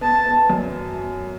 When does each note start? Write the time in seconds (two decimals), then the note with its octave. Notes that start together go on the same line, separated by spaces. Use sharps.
0.01 B3 A5
0.25 B3
0.50 F#2